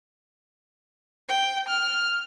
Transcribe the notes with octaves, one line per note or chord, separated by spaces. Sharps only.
G5
F6